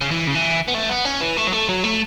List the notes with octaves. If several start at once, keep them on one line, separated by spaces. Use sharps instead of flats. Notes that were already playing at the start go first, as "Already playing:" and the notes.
C#3
E3
C#3
E3
B3
A3
B3
C#4
E3
A3
F#3
A3
F#3
A3